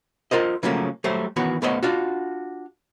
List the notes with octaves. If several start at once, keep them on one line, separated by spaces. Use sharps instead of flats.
F4 A#4 C5 D#5
C#3 F3 F#3 A3 A#3 C#4
F#3 G3 A3 C5
D#3 E3 B3 F#4 C#5
B1 A3 B3 C5 C#5 D#5
D4 F4 F#4